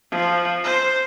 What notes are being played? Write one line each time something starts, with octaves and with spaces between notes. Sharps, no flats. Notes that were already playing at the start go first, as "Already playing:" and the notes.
F3
C5